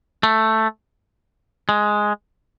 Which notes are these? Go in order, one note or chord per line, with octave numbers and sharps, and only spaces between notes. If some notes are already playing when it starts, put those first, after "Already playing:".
A3
G#3